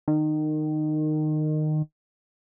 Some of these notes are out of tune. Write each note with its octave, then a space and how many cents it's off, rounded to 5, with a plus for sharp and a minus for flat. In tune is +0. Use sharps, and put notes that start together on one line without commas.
D#3 -20